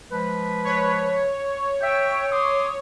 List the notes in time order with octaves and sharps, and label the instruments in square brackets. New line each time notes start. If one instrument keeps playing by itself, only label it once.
[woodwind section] F3 G#3 B4
[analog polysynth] C#5
[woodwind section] E5 G5
C6 D6 D#6